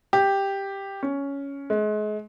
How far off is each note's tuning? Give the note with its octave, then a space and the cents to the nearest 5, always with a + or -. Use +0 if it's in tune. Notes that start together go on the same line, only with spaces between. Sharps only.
G4 +5
C#4 +10
G#3 +35